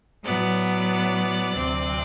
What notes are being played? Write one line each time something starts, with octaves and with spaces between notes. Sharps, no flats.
A2 F#3 B3 D5
D2 C3 F#3 C4